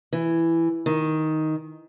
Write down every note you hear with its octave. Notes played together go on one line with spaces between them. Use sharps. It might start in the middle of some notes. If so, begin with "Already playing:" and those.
E3
D#3